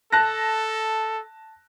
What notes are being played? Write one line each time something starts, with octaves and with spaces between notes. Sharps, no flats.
A4 A5 F#6 A#6